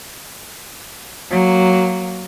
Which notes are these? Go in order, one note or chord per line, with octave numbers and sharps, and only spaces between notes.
F#3 A#3